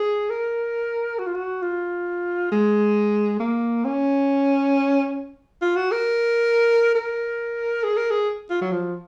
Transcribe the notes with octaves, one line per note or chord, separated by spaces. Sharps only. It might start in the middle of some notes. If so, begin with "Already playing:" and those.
Already playing: G#4
A#4
F#4
F4
F#4
F4
G#3
A#3
C#4
F4
F#4
A#4
A#4
G#4
A#4
G#4
F4
F#3
F3